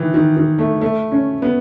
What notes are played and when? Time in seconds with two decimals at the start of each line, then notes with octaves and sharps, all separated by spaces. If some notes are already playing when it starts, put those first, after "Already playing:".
Already playing: D#3 E3
0.14 D#3
0.37 D#3
0.59 A3
0.81 A3
1.12 C#4
1.42 B3